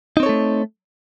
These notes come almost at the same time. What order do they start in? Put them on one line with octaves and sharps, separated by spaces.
D#4 C4 C#5 A4 A3